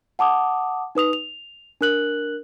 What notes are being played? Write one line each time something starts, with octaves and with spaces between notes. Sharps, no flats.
F#5 A5 D6 D#6
D#4 B4 D#6 F7
F7
D4 A#4 F#6 F#7